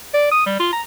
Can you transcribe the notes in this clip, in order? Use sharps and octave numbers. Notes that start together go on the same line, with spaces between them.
D5
D#6
G3
F4
A#5